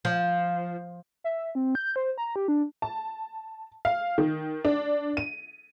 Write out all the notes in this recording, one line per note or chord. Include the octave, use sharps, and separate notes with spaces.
F3
E5
C4
G6
C5
A#5
G4
D4
A5
F5
D#3
D4
D#7